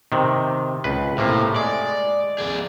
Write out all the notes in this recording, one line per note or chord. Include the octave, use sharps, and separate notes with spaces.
C3 D#3
C#2 B4
A2 C3 A#3
G#3 D5
G#4 D5